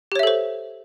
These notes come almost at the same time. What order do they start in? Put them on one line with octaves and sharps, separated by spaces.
G4 C#5 E5 A4 C5